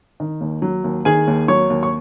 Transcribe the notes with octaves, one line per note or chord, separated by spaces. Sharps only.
D#3
D#2
F#3
D#2
D#3 G#4 G#5
D#2
F#3 C#5 C#6
D#2
C#6